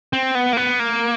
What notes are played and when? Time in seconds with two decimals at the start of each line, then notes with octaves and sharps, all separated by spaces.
0.13 C4
0.35 B3
0.53 A#3
0.57 B3
0.79 A#3